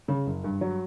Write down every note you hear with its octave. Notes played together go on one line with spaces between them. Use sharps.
C#3
F#1
G2
F#3